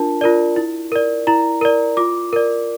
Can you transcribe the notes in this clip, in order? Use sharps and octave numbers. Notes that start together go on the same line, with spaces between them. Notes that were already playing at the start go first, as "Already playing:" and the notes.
Already playing: D4 F4 A#4 A5
F4 A#4 D5
E4
A#4 D5
E4 A#5
A#4 D5
F4 D6
A#4 D5